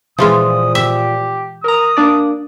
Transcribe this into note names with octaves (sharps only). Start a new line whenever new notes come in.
A#2 E3 F3 G#3 F4 D#6
G4 E5
A#4 A#5 D#6
A#3 D4 D5